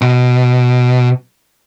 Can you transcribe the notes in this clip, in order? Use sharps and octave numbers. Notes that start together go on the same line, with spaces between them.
B2